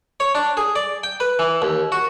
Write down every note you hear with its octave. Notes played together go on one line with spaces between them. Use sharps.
C#5
D4
G#4
D5
G5
B4
E3
D#2
F#4